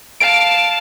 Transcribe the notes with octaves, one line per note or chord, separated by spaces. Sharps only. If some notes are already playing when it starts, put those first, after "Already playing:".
F5 A5 D7